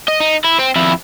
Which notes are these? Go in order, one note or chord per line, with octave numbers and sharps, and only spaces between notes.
D#5
D#4
E4
C4
F2 E4